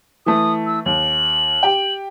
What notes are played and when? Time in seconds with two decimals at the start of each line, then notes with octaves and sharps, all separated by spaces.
0.26 E3 A3 D#6
0.67 E6
0.86 D#2 F#7
1.63 G4 G5